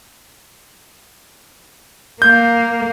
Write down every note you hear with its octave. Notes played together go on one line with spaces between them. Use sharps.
A#3 G6